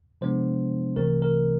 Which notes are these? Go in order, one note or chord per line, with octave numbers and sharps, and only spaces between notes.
C3 F3 G#3 B3 D4 C5
C2 C3 E3 A3 C4 A#4
A#4